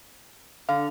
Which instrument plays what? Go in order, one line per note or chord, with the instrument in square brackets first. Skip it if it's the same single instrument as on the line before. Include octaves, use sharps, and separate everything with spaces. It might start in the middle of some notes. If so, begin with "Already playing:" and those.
[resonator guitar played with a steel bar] D3 [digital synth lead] F5